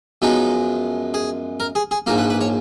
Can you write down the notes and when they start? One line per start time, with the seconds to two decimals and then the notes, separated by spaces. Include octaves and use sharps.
0.22 F#2 F3 G#3 B3 D#4
1.14 G#4
1.60 A#4
1.75 G#4
1.91 G#4
2.06 A#1 G#2 F3 A#3 A#4
2.18 B4
2.30 B4
2.41 C#5